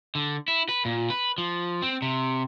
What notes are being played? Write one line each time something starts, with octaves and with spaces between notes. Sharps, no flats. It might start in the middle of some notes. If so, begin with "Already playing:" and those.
D3
E4
B4
A#2
B4
F3
C4
C3